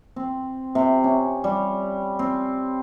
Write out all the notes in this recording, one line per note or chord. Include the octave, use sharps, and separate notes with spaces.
C4
C3
C#4
G3
C4